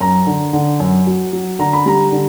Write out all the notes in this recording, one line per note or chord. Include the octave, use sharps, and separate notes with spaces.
F#2 A#5
D3
D3
F#2
F#3
F#3
D3 A#5
B5
G3 A#5
D3